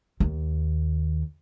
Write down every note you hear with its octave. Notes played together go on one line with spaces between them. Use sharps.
D#2